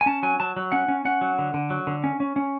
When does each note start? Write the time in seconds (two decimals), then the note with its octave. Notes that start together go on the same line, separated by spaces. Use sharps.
0.01 G#5
0.06 C#4 A5
0.23 F#3 G#5
0.40 F#3 A5
0.57 F#3
0.72 C#4 F#5
0.88 C#4
1.05 C#4 F#5
1.21 F#3
1.38 D3
1.54 D3
1.70 F#3
1.87 D3
2.04 C#4
2.20 C#4
2.36 C#4